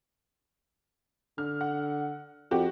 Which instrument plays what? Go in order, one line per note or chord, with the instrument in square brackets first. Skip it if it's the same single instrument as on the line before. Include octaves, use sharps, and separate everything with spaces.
[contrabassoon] D3 [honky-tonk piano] F6
[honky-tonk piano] F#5
[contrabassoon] F2 [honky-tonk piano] F#4 G4